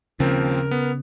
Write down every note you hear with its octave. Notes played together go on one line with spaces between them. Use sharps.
D#2 C#3 F3 C4 A#4
B3